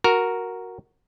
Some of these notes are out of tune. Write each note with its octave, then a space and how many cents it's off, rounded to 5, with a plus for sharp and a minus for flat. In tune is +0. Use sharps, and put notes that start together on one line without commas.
F#4 +0 A#4 +0